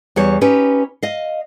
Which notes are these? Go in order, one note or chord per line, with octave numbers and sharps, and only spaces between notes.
E2 G3 C#5
C#4 D#4 G4 B4
D#5 F5